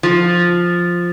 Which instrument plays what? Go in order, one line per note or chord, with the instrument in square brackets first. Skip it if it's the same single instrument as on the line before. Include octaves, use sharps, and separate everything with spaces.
[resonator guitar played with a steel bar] F3